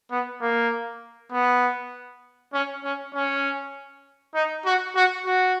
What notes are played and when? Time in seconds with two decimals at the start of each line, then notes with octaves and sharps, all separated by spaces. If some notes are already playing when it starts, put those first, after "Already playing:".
0.11 B3
0.42 A#3
1.32 B3
2.53 C#4
2.84 C#4
3.14 C#4
4.35 D#4
4.65 F#4
4.96 F#4
5.26 F#4